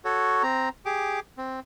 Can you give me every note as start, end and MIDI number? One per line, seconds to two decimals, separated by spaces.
0.05 0.43 66
0.05 0.43 69
0.05 0.43 73
0.43 0.69 60
0.43 0.69 82
0.86 1.20 67
0.86 1.20 68
0.86 1.20 86
1.38 1.60 60